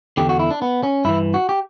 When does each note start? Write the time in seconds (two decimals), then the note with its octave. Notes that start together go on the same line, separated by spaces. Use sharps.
0.17 E2 D3 G4
0.29 F#4
0.39 E4
0.51 D4
0.62 B3
0.83 C#4
1.05 G2 E3 E4
1.34 F#4
1.49 G4